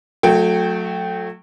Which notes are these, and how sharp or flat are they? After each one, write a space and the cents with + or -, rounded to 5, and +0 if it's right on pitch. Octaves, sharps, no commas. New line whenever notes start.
F#3 -30 A3 +0 G5 +0